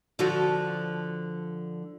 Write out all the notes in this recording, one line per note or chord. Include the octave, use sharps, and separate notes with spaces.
D3 F3 F#4